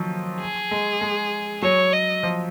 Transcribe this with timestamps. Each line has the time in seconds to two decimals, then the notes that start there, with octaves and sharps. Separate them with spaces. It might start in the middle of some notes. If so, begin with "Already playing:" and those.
Already playing: D#3 F3 F#3
0.41 G#4
0.71 G#3
1.01 G#3
1.62 F#3 C#5
1.93 D#5
2.23 F3